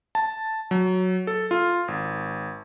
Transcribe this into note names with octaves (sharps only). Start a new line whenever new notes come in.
A5
F#3
A4
F4
G#1